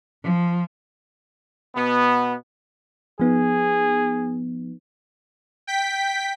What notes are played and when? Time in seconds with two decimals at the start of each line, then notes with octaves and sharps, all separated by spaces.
0.23 F3
1.76 B2 B3
3.20 F3 B3 D#4 G#4
5.67 G5 B6